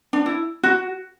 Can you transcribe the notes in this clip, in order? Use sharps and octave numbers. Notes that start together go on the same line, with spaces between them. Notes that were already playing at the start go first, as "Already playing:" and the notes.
D4
E4
F#4